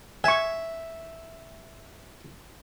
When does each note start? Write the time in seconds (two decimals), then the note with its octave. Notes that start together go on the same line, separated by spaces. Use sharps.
0.24 E5 G#5 C#6